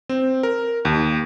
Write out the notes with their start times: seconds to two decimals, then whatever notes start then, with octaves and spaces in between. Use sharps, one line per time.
0.09 C4
0.43 A#4
0.85 D#2